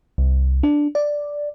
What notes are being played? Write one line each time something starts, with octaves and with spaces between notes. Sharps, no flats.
C2
D4
D5